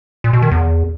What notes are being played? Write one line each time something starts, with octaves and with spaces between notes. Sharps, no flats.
A#2
B2
D#3
E2